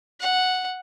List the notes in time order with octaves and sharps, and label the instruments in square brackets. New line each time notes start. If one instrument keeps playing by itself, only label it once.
[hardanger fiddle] F#5